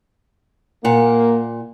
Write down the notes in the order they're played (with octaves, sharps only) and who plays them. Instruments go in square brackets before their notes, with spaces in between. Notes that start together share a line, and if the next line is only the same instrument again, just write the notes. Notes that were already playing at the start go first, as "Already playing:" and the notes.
[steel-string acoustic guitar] A#2 F#5 [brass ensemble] A#3